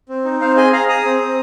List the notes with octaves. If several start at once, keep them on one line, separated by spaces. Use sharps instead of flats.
C4
D#4
C4 C5 F5
G#4 D#5 G#5
G#4 F5 A#5
G#4 A#5 D#6
C4
C4